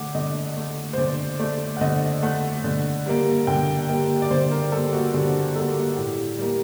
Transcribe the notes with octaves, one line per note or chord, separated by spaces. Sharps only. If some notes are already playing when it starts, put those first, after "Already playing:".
Already playing: D3 A3 F#5 D6
D3 D#5
A3
C5
D3 D5
A3 D5
F#5
D3 D#5
A3 F#5
D3
G3 A#3
D3 G5
G3 A#3
D5
D3 C5
A#4
G3 A#3 A4
F#4
D3 G4
G3 A#3 A4
A2 G4
G3 A#3